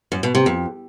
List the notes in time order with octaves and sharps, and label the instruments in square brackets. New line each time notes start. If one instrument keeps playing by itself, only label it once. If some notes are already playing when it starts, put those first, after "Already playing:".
[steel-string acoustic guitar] F#2
B2
C3
F2